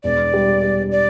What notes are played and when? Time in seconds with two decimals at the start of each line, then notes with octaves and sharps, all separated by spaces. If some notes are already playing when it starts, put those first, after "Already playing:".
0.04 E1 D5
0.34 G3
0.62 G3
0.91 D5